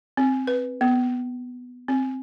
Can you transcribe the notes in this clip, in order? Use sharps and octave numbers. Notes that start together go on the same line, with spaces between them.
C4
B4
B3
C4